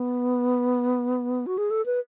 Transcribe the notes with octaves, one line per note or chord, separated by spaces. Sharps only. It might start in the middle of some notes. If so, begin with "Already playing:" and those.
Already playing: B3
F#4
G#4
A4
B4